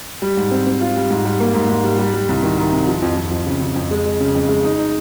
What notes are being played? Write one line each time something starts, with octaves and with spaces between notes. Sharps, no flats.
G3
G#2
C4
C4
F4
G3
G#2
G3
A#3
G#2
G#2
G3
G3
G3
C2
D#3
D#3
C3
F3
F2
F2
F2
C#3
C#3
F2
G#3
G#3
C#3
F2
G#3
D#4
D#4